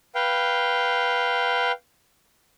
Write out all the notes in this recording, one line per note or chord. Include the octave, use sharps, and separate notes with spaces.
B4 F5 G5